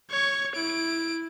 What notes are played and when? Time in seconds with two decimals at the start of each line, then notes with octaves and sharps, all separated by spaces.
0.10 C#5 C#6
0.55 E4 D7